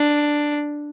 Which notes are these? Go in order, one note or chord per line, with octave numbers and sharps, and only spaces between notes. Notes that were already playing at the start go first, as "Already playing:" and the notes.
Already playing: D4